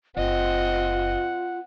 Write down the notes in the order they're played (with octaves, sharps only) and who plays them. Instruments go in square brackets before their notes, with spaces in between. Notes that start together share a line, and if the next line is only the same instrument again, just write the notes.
[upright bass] F#1 [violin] C4 D#5 [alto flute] F4 [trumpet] F#5